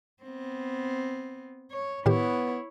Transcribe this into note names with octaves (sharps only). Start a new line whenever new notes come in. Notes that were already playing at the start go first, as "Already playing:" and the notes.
B3 C4
C#5
A2 D#3 B3 E4 G4 C#5